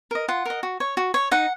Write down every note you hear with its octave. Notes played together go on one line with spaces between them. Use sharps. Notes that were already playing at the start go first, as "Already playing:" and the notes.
A#4 D#5
F4 F#5
A#4 D#5
F#4
C#5
F#4
C#5
D#4 F#5